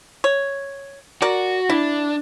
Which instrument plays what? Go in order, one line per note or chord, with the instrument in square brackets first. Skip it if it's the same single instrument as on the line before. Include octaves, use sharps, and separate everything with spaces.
[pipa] C#5
[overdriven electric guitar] F#4 [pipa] A#4 D5
[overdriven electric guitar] D4 [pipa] E4